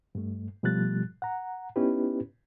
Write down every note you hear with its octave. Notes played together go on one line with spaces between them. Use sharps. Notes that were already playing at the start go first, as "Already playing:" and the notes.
G2 A3
B2 F3 G3 A3 F#6 A6
F#5 A#5
B3 C#4 D#4 E4 G4 B4